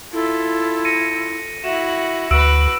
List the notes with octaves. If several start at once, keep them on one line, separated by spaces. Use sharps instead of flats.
E4 F4 A4
A#6 C#7 D#7
D#7
E4 F#4 E5 E7
D2 F#4 B4 E6 D7 E7